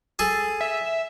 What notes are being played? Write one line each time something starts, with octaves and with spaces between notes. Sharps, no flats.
G#4 A4
E5